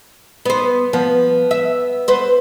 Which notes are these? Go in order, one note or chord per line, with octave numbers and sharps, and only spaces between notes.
B3 C5
F3 B3
E5
B4 C5